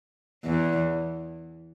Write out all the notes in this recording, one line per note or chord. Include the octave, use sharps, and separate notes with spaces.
E2